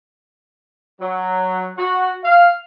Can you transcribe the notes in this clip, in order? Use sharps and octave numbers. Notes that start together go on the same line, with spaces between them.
F#3
F#4
F5